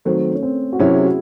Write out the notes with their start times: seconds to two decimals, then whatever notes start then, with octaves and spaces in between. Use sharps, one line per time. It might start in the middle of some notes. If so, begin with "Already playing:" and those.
0.05 D#3 F#3 A3 C4
0.34 C#4
0.42 C4
0.72 F#4
0.79 C3 F#3 C#4 E4
0.94 G#4
1.04 F#4